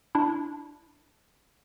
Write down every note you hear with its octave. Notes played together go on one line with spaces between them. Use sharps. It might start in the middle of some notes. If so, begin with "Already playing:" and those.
D4 E4